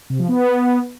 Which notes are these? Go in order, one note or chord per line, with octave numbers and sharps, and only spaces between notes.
C3
F3
B3